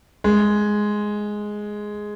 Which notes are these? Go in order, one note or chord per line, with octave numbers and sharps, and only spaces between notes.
G#3